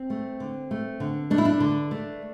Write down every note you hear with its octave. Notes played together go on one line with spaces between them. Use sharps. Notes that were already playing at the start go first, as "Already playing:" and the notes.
Already playing: C4
A3
D3
A3
D3
A3 D4
E4
D4
D3
A3